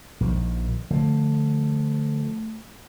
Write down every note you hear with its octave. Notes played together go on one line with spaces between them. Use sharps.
A#1 D#3 F3
D3 F3 A3